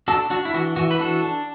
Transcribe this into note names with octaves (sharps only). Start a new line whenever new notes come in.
D4 F#4 A4
D4 F#4
E4
E3 F#4
E3 F#4
B4
D4 F#4 A4
D4